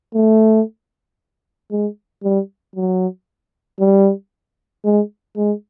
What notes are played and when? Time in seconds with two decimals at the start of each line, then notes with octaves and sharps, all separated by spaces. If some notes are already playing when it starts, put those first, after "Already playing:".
0.15 A3
1.71 G#3
2.24 G3
2.76 F#3
3.80 G3
4.85 G#3
5.37 G#3